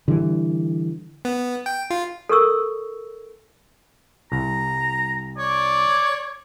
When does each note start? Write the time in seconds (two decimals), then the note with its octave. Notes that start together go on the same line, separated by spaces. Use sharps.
0.08 D3 E3 G3
1.25 B3
1.66 G5
1.90 F4
2.29 A4 A#4 C#6 E6
4.32 C2 A#5
5.38 C#5 D5